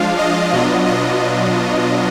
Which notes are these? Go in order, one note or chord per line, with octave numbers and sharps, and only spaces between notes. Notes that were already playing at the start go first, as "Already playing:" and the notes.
Already playing: F3 G#3 D4 F4 F5
D#5
B2 F#3 B3 D4 F4 D#5
D#5